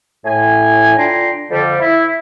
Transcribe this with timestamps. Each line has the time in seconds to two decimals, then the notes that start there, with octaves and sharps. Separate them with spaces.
0.25 A2 G#5
0.97 D3 D4 F4 G5 A#5 C6
1.50 F2 D3 G3
1.80 E4